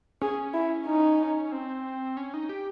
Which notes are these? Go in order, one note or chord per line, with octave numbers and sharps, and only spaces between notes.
C#4 G#4
E4
D#4
C4
C#4
D#4
G4